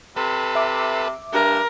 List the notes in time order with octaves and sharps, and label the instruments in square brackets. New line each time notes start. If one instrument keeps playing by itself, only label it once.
[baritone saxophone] C3 [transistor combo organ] A4 B4
[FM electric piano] E5 D6
[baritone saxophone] G2 [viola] A#4